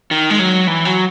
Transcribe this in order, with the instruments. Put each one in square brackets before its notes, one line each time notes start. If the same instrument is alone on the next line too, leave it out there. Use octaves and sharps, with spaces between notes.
[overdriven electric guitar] D#3
G#3
F#3
E3
F#3